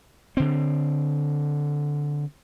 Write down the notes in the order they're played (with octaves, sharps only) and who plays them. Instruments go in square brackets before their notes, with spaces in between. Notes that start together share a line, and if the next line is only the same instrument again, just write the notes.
[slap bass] D3 C4